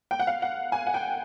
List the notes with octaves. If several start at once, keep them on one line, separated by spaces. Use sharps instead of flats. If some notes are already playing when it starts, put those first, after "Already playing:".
G5
F#5
F5
F#5
G#5
F#5
G5